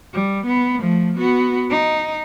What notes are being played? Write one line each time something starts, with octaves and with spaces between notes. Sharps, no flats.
G3
B3
F3 A3
B3 F#4
D#4